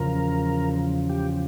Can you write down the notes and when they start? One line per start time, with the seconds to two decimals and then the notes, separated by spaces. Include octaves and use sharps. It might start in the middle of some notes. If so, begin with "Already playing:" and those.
Already playing: E2 C#3 F3 A#4
1.10 G4